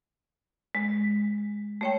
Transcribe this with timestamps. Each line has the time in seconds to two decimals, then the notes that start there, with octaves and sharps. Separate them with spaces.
0.75 G#3
1.81 A3 C#5 G5